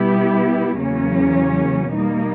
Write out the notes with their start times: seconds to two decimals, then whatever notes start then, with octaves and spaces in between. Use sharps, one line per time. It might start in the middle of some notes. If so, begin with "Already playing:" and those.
Already playing: B2 G3 B3 E4 G4
0.79 E2 C#3 F#3 A#3 C#4
1.92 B2 G3 A#3 D#4